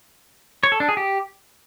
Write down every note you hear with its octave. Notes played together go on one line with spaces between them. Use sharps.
C#5
A4
D4
G#4
G4